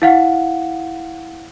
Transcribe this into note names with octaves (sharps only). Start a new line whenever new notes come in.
E4 F5 F#5